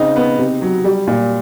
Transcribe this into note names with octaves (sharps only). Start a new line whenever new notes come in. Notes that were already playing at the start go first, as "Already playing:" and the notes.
Already playing: C#3 C4 D#4
B3
C3
F#3
G3
A#2